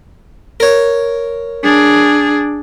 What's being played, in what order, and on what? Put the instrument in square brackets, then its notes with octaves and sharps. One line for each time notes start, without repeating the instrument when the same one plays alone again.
[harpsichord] A#4 C#5
[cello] D4 G#4